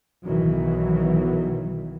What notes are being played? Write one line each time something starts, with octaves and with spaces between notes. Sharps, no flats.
B1 B2 D#3 E3 F#3